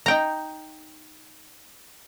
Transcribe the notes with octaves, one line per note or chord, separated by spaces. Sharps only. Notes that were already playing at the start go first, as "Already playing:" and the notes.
D#4 G5 A#5